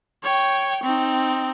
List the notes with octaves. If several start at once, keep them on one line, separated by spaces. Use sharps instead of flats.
C#5 G5
C4 D#4